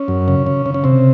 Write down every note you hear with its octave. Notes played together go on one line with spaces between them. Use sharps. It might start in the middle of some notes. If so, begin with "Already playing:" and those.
Already playing: C#4
F#2
C#3
C#3
C#3
C#4
C3 C4